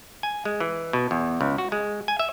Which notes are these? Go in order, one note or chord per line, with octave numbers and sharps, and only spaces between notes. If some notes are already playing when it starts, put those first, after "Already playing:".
G#5
G#3
E3
B2
E2
C#2
F#4
G#3
G#5
E5